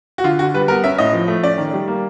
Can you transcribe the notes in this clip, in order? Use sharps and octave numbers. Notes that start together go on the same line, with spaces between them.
F#4
D3 F4
D3 F#4
G3 B4
B3 A#4
C#4 E5
A2 D#5
F3
A3
C#4 D5
D#3
G3
A#3